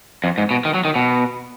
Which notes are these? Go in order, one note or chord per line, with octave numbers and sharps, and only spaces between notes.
F2
G#2
B2
D#3
F#3
D#3
B2